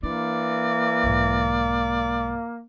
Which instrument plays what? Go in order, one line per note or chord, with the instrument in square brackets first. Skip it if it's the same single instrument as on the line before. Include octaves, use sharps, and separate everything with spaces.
[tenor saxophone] E3 [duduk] A#3 [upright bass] D4 [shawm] D5
[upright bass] B1 G#2